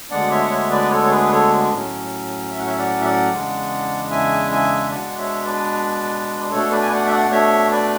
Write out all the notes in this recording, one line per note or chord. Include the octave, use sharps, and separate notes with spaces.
D2 D3 G#3 B3 D4 D5 F#5
C#5 E5
F#5
C#5 E5
B4 D5
A4 C#5
C#5
G#4 B4
A4 C#5
A2 F#3 C#4
E5
F#5
C#5 E5
D5 F#5
E5
D5 F#5
E2 C#3 G#3 D4
E5 G#5
E5 G#5
B2 G#3 D4 D5 F#5
C#5 E5
B4 D5
B2 A3 D4 A4 C#5
B4 D5
G#5
D5 F#5
E5
D5 F#5
C#5 E5
B4 D5